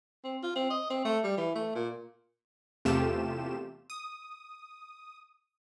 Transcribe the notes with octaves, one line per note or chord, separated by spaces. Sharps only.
C4
F4
C4
D#5
C4
A3
G3
E3
A3
A#2
E2 C3 A3 F4 G4 E7
D#6